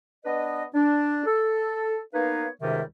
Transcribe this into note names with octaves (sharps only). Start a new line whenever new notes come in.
B3 D4 B4 D#5
D4
A4
A#3 B3 D#4 B4 C#5 F5
C#2 G#2 C3 D#3 G3 E5